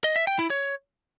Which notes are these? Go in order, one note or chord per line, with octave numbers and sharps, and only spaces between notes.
D#5
E5
G5
E4
C#5